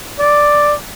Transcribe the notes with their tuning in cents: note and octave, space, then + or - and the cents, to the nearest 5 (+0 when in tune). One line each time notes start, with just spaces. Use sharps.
D5 +5